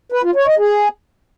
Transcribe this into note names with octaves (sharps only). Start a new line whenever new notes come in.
B4
F4
C#5
D#5
G#4